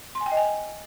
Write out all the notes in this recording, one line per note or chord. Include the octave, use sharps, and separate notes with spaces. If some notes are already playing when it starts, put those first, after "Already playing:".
C6
G#5
G5
D#5
G#5